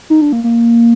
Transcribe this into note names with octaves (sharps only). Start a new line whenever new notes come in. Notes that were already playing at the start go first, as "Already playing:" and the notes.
D#4
D4
A#3
A#3